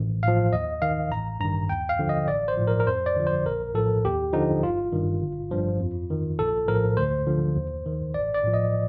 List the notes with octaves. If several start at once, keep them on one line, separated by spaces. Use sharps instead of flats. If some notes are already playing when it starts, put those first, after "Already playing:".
Already playing: A1
A2 F3 F5
D#2 D#5
D#3 F5
A1 A#5
G2 D#3 A#5
D#2 G5
F5
D3 F3
D#5
A1 D5
C5
A2 F3
A#4
A#4
F2 C5
D5
D3 F3
C5
A#1 A#4
A2 F3 A4
D#2 G4
D3 F3 D#4
G1 F4
G2 D#3
G1
G2 F3
F2
D#3
A#1 A4
A2 F3 A#4
D2 C5
D3 F3
D#2
D#3
A1 D5
D5
A2 F3
D#5